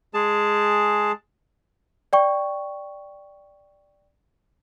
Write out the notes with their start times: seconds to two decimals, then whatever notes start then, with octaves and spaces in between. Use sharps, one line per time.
0.14 G#3 G#4 A5
2.13 D5 G5 C#6